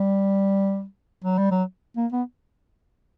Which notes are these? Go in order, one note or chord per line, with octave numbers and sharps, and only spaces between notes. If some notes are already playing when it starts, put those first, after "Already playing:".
Already playing: G3
F#3
G3
F#3
A#3
B3